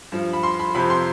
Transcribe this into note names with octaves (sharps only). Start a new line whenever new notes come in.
G2 F3
B5
C6
B5
F2 C3 F3 B5
C6